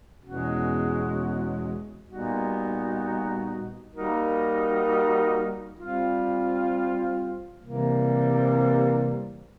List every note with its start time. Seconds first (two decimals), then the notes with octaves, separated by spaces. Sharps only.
0.23 E2 B2 G#3 C#4 F#4
2.08 A#2 G3 B3 D#4 F#4
3.93 G3 A#3 D#4 F#4 A#4
5.78 G3 C4 F4
7.62 C3 E3 G3 A#3